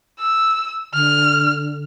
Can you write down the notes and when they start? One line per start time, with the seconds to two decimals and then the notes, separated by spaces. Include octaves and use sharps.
0.20 E6
0.93 D3 F6